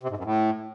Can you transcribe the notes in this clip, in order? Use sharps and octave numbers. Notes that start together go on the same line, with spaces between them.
C3
G#2
F#2
A2